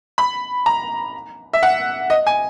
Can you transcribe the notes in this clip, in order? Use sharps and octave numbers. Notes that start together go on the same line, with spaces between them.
B5
A#5
E5
F#5
D#5
G#5